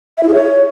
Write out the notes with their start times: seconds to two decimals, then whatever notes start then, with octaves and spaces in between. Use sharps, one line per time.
0.18 E5
0.23 E4
0.29 G#4
0.34 C#5